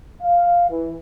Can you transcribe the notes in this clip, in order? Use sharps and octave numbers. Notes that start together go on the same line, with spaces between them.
F5
E3